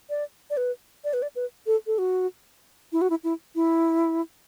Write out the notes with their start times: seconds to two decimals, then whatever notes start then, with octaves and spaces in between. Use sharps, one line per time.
0.10 D5
0.50 D5
0.57 B4
1.04 D5
1.13 B4
1.22 D5
1.36 B4
1.67 A4
1.87 A4
1.98 F#4
2.92 E4
3.01 F#4
3.10 E4
3.24 E4
3.55 E4